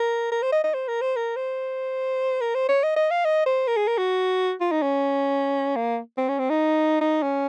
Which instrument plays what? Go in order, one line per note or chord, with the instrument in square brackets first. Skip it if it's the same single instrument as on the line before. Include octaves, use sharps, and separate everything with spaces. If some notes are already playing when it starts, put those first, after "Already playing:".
Already playing: [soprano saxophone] A#4
A#4
C5
D#5
D#5
C5
A#4
C5
A#4
C5
A#4
C5
C#5
D#5
D#5
F5
D#5
C5
A#4
G#4
A#4
F#4
F4
D#4
C#4
A#3
C4
C#4
C4
D#4
D#4
C#4